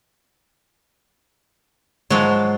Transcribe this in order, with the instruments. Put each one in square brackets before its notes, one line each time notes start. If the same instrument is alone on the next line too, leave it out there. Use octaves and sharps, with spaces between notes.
[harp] G#2 [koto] F3 F#3